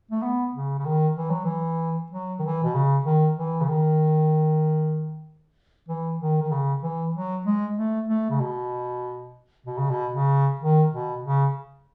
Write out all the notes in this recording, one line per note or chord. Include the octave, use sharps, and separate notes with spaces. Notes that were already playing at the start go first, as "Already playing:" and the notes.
A3
B3
C#3
C#3
D#3
E3
F#3
E3
F#3
D#3
E3
B2
C#3
D#3
E3
C#3
D#3
E3
D#3
D#3
C#3
E3
F#3
G#3
A3
A3
C#3
B2
B2
C#3
B2
C#3
D#3
B2
C#3